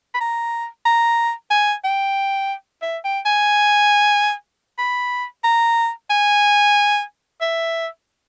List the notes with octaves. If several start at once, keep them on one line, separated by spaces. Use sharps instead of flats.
B5
A#5
A#5
G#5
G5
E5
G5
G#5
B5
A#5
G#5
E5